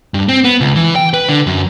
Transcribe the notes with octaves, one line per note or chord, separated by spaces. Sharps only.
G2
C4
B3
C#2
E3
G5
B4
D3
F#2